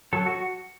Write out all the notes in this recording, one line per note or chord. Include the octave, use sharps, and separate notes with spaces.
F#3 A4
F#4